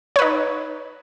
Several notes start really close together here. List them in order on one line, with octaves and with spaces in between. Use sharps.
C#5 B4 D#4